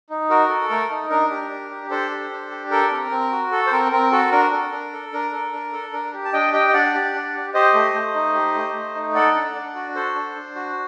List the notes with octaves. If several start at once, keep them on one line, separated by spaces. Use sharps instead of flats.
D#4
F#4 A#4
A4
A3 A#4
D#4
D4 A#4
G4
D4
G4
D4 A4 C5
G4
D4
G4
A4 A#4
C4
C4
F#4
A4
C5
C4 A#4
C4 A#4
F#4 A4
D4 A#4
A4
D4
A4
D4 A#4
A4
D4
A4
D4 A#4
G4
A5
D4 D#5 G5
G4 D#5 G5
D#5
D4 D5 F#5
G4
D4
G4
G4 C5 D#5
A3
A3
D#4
G4
A3
A3
D#4
A4 D5 F#5
D4
D4
F#4
A4 C5
D4
D4
F#4